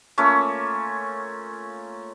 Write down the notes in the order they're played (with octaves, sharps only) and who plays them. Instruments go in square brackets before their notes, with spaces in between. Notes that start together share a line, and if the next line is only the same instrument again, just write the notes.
[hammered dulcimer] A3 A#3 C#4 F4